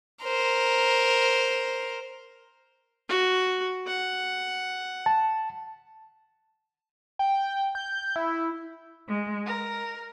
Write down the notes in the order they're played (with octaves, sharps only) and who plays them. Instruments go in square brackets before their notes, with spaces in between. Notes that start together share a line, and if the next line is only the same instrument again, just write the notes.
[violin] A#4 C5
[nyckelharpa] F#4
F#5
[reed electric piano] A5
[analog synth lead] G5
G6
E4
[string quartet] G#3
A#4